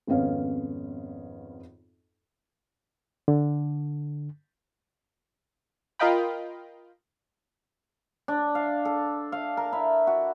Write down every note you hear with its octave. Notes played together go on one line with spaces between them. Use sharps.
G#1 F2 B3 C#4 F5
D3
F4 A#4 D#5 F5 G5 B5
D4
F5
A4
F5
A#4
E4
F#4